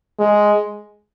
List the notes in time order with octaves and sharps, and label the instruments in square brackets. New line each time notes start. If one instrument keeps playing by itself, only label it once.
[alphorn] G#3